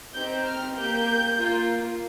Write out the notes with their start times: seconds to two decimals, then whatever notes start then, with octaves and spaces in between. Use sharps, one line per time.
0.15 C4 D#4 G4 G6
0.45 F6
0.76 A#3 G4 G6
1.38 A#3 F4